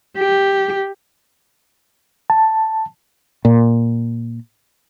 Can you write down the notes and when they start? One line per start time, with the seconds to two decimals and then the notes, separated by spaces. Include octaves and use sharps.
0.18 G4
2.30 A5
3.45 A#2